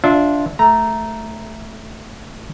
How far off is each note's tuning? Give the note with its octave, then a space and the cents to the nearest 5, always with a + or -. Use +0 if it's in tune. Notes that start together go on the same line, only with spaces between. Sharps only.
D4 -15 F4 +0 E5 -20
A3 +0 A#5 +0